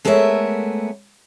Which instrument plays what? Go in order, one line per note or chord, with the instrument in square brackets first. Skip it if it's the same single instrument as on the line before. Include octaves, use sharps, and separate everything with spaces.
[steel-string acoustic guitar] G#3 A3 B3 A#4 C#5 E5